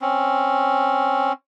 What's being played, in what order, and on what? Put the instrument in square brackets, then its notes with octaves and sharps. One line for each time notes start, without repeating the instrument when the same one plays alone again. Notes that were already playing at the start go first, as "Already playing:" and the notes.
[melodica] C4 C#4